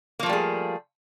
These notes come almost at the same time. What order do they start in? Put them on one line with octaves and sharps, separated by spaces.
A#3 F3 A3 G3 G#4